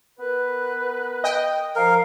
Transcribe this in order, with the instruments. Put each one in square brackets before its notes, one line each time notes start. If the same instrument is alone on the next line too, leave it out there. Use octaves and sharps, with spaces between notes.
[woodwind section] B3 A#4 B4
[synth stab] D#5 G5
[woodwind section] F3 F5 [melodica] A#4